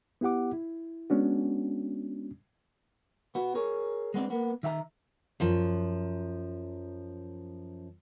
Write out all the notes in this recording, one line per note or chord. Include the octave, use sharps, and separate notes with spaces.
B3 E4 G4 F#5 D6
E4
G#3 B3 C#4 D4 F#4
B3 F#4
G#4 A#4 C#5
G#3 B3 C4 D4
A#3 B3
D#3 E5 F5 A#5
F#2 F3